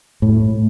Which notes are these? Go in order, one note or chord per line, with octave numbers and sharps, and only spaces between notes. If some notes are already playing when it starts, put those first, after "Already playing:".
A2